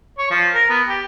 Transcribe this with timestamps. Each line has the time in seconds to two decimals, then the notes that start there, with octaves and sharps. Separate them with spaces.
0.18 C#5
0.30 F3
0.54 A#4
0.70 B3
0.88 G4